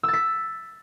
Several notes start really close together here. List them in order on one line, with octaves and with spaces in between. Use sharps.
E6 A6 B6